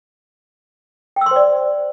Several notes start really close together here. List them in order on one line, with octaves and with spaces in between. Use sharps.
G5 E6 C6 C5 D5